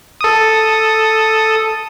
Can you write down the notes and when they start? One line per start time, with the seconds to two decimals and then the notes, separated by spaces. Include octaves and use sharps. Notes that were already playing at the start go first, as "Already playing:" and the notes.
0.21 A4 D#6